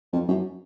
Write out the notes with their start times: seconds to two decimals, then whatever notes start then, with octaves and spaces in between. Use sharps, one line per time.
0.13 F2
0.28 F#2